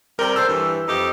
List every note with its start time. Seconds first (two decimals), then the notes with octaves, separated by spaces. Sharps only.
0.19 C3 G3 A#4
0.36 A4 C5 E6
0.47 G2 E3
0.87 F2 D#4 G4